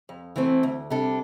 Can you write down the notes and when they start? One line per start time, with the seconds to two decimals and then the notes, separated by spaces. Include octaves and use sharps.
0.09 F2
0.36 E3 A3 C4
0.63 D2
0.90 C3 G3 D4 A4